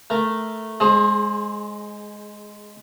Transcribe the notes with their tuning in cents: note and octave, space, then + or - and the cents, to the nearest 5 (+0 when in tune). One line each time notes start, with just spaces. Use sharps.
A3 +0 A#4 -5
G#3 +0 G#4 +20 C5 +30